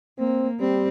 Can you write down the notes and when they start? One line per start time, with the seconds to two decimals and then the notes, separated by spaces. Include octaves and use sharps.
0.19 A#3 C4
0.60 G3 C4